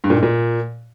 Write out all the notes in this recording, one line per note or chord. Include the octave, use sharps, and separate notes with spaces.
G2
A#2
G#2
A#2